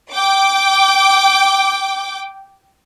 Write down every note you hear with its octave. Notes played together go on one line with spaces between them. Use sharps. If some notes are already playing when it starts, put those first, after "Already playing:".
G5 D6